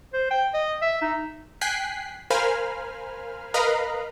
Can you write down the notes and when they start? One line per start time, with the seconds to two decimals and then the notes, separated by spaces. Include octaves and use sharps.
0.13 C5
0.31 G5
0.54 D#5
0.82 E5
1.02 D#4
1.61 G5 G#5 F#6 B6 C7
2.30 A#4 C5 F5 G#5 B5 F6
3.54 A#4 B4 D#5 F5 A#5 B5